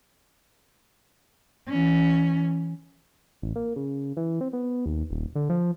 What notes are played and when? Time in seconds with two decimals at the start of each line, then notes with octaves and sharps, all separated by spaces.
1.68 E3 C#4
3.42 A1
3.56 A#3
3.76 C#3
4.17 E3
4.41 C4
4.53 B3
4.86 D#2
5.11 D#1
5.35 D3
5.50 F3